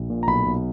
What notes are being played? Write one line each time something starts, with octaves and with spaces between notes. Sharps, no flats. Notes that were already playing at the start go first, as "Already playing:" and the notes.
Already playing: A#1
A#2
A#5
B1 B5
B1